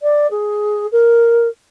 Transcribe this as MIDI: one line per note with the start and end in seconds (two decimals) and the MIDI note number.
0.02 0.27 74
0.31 0.86 68
0.92 1.48 70